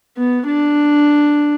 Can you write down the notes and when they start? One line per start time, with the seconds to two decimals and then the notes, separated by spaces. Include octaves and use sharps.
0.17 B3
0.46 D4